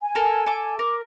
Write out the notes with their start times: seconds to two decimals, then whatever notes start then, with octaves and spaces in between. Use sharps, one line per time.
0.01 G#5
0.15 A4 A#4
0.46 A4 E5 D6
0.79 A#4 D6